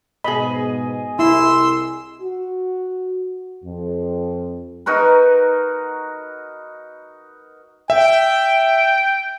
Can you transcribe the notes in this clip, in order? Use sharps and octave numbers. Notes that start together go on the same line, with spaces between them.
G#2 B2 G#4 D#5 B5
C2 E4 C6 E6
F#4
F2
D#4 F#4 A#4 B4
E5 G5